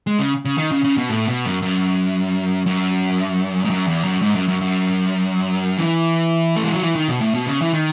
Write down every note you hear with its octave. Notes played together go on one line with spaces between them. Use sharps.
G#3
C#3
C#3
D#3
C#3
C#3
B2
A2
B2
F#2
F#2
F#2
G#2
F#2
E2
F#2
G#2
F#2
F#2
F#2
E3
A3
G#3
F#3
E3
D#3
B2
A2
B2
C#3
E3
D#3